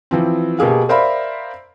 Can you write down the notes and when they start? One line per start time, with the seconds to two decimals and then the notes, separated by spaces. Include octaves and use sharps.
0.11 E3 F3 C4
0.59 B2 A#3 G4 G#4 F5
0.89 A#4 C5 D5 E5 F5 B5